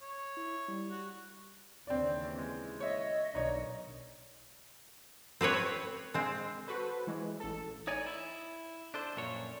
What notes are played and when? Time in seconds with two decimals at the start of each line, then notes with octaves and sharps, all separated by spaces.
0.01 C#5
0.37 E4
0.68 G3
0.91 F#4
1.87 D#2 C#3 E3 C4 D4 D5
2.38 G#3
2.81 C#5 D#5 E5
3.33 B1 D#3 D4 D#4 C#5
5.41 C4 G4 B4 C#5
6.14 G#3 C4
6.67 F#4 A4 B4 C5
7.07 E3 G#3
7.40 A1 A4
7.87 D#4 C#5 D5 G#5
8.07 E4
8.94 D4 A4 C5
9.16 F#2 A#2 F3 C#5